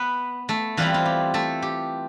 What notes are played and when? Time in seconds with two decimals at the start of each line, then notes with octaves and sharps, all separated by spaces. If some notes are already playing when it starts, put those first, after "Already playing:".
Already playing: B3 B4
0.49 A3 A4
0.77 E3 G3 C4 E4 F4
0.94 F4
1.05 G4
1.34 A3 A4
1.62 G4